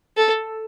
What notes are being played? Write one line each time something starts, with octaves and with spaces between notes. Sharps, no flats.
A4